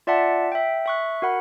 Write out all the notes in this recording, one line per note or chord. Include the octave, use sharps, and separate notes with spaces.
F4 D5 E5 F#5 A5
E5 G5
E5 C#6 F#6
F#4 A#4 F#5 B5